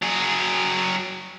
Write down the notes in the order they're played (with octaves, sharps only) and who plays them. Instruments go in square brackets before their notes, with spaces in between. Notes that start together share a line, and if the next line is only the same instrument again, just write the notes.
[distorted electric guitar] F#3 G#4